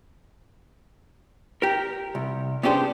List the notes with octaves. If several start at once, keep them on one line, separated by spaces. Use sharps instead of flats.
G4 A#4
C2
B3 C#4 D4 G4 G#4 C5